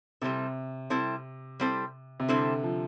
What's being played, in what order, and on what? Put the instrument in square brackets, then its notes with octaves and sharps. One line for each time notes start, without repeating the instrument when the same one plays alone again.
[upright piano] C3 [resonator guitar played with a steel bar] G3 C4 E4 A4
[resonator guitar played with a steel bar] G3 C4 E4 A4
G3 C4 E4 A4
[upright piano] C3
[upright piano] D3 [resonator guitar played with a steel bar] G3 C4 E4 A4
[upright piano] F3